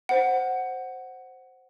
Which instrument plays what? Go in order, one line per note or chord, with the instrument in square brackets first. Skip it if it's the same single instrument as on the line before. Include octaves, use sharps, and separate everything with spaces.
[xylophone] C5 F#5